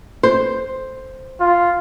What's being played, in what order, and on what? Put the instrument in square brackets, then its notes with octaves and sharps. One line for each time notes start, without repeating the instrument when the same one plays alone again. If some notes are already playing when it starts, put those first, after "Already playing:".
[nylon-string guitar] C5
[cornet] F4